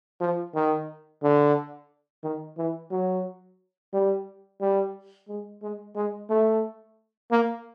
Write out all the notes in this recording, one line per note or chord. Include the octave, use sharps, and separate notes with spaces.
F3
D#3
D3
D#3
E3
F#3
G3
G3
G#3
G#3
G#3
A3
A#3